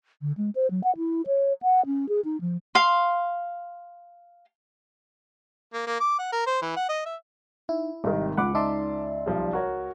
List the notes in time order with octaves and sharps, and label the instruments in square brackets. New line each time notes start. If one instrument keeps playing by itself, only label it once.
[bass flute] D3
G#3
C5
F#3
F#5
E4
C#5
F#5
C#4
G#4
D#4
F3
[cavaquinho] F5 C6
[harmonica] A#3
A#3
D6
F#5
A#4
C5
E3
F#5
D#5
E5
[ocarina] D#4 [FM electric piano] E4
[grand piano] G#1 C3 D#3 [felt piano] G3 [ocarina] D#5
[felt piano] C#2 [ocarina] F4 [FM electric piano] F#5 [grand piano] B5 D6
[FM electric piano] D#4 E5 C6 [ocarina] D5 [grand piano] A5 D6
[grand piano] B1 F3 G3
F#4 A#4 C#5